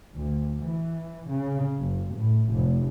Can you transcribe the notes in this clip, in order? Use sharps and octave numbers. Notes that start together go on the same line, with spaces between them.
D2
E3
C#3
F#1
A2
F1